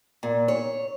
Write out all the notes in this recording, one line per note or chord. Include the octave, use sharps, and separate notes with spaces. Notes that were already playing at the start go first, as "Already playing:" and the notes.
A#2
C#5